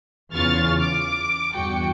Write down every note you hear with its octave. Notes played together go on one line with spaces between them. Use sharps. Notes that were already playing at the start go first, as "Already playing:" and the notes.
E2 C#3 F4 C#6 F6 A6
D6
E2 G2 F#4 G5 C#7